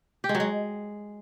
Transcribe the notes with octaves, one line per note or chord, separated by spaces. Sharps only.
G4
G#3
F#3
G#3